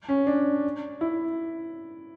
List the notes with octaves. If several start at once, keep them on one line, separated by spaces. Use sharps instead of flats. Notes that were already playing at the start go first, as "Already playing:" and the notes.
C#4
D4
E4